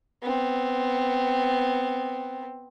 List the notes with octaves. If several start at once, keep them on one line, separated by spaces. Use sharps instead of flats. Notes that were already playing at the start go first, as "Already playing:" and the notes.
B3 C4